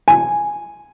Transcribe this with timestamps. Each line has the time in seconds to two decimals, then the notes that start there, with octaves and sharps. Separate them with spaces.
0.08 G#5